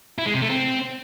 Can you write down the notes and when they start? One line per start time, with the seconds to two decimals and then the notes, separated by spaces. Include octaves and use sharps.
0.18 E4
0.26 G#3
0.34 C3
0.42 A3
0.49 C4